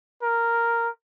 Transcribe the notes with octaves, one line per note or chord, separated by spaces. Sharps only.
A#4